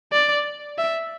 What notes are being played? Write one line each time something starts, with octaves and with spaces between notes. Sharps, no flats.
D5
E5